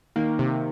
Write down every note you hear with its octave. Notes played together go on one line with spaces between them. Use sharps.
D#3 A#3
C3